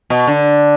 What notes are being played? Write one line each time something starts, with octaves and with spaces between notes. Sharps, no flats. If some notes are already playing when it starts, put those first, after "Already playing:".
B2
D3